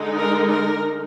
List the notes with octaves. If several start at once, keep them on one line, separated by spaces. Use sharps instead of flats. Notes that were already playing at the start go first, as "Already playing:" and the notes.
Already playing: D3 G#3 D#4
A#4
A#4